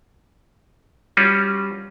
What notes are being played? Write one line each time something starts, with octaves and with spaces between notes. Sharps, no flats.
G3 C#4 F4 F#4